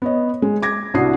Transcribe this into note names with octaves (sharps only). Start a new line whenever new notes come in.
B3 C#5 D#5
G#3
D6 G#6 A#6
C2 D4 E4 F#4 D#6 C7